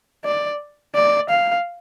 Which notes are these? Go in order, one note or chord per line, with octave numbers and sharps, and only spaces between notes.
D5
D5
F5